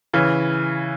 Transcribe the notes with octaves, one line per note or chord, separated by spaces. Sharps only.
C#3 E3